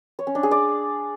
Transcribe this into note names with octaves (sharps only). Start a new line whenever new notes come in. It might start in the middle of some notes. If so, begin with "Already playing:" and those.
C#5
C#4
D4
G#4
D5